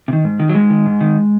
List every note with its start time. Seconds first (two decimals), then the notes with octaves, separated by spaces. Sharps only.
0.08 C3
0.13 D#3
0.24 G#2
0.40 D#3
0.49 F#3
0.55 G#2 G#3
0.70 D#3
0.86 G#2
1.01 D#3